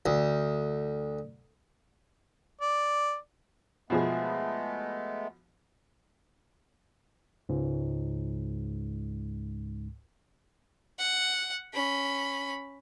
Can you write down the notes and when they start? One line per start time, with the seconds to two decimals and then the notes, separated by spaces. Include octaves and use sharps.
0.06 D2
2.61 D5
3.90 B2 F3 G#3 A3 B3 G#4
7.49 C#2 G#2
10.98 F#5
11.74 C#4 B5